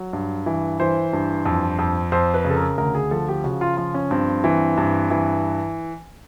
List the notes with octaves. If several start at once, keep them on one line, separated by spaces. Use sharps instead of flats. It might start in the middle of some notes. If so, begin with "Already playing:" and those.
Already playing: F#3
G2
E3
E3 C5
G2
F2
F2
F2 C5
B4
C#3
A4
A#4
D2 A#4
G#4
F3 A4
G4
C#3 F#4
F4
F3 F4
C#4
G2 C4
E3
G2
E3